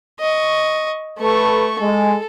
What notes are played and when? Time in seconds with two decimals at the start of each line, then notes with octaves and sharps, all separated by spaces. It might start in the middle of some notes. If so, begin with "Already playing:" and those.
0.20 D#5 C#6
1.19 A3 A4 B4 C#6
1.80 G#3 A4